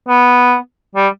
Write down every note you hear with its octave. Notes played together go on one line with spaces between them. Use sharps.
B3
G3